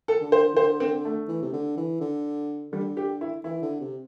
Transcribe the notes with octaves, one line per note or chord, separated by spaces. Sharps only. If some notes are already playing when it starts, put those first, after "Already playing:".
A4
D3
C5
E3
D3 C5
C4
A3
E3
C3
D3
E3
D3
D3 G3
G4
E4
E3 E4
D3
C3